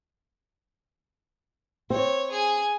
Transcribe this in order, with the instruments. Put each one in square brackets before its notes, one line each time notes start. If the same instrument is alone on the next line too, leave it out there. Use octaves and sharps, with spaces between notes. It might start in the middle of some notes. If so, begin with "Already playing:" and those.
[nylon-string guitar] C4 [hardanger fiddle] C#5
[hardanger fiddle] G#4 G#5